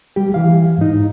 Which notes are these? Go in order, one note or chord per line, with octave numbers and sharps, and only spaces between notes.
G3 G4
E3 F5
G#2 D#4